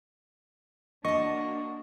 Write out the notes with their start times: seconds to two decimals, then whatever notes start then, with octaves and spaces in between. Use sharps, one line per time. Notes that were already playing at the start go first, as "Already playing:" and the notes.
1.05 A#3 D4 F#4 D#5 A5 C#6